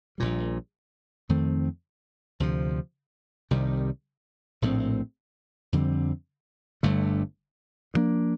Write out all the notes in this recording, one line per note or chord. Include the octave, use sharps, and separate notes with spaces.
A#1 A#2 G3
F2 D#3 A3 C4
D2 C3 F3
C2 C3 D#3 G3
A#1 A2 A3 C4
F2 D3 G3 C4
G1 G2 D3 A3
G2 F3 A#3 D4